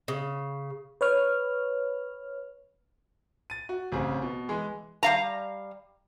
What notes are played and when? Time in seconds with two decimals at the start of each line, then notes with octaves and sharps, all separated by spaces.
0.08 C#3
1.01 B4 C#5 F6
3.50 A6 D#7
3.69 F#4
3.92 A1 C#3 C4 G#4
4.22 B2
4.49 E3 G#3 G#4
5.03 G3 F5 A#5